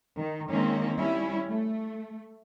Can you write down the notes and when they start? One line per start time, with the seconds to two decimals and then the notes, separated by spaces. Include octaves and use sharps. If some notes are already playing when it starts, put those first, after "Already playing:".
0.19 D#3
0.50 D#3 G#3 A#3 C4 C#4
0.96 G3 C#4 E4
1.50 A3